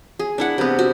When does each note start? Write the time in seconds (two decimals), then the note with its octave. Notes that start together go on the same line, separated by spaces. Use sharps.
0.19 G#4
0.38 D4 E4 F#5
0.58 C3 B3
0.79 F#4